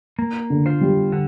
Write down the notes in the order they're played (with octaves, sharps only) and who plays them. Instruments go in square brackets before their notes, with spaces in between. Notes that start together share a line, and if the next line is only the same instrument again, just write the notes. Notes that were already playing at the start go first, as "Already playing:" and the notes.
[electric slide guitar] A#3
[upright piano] D3
[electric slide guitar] F4 C5
[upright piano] G3
[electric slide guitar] D3